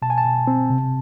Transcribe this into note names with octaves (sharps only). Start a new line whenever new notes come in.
B2 A5
G#5
A5
B2
C4
C3